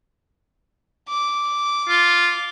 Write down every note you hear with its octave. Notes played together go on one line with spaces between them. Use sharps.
D6
F4